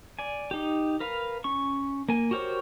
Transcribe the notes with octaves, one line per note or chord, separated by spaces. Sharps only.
D5 G#5
D#4 G4
A#4 B4 F5
C#4 C#6
A#3 G#5
F#4 G4 A#4 C5 C#5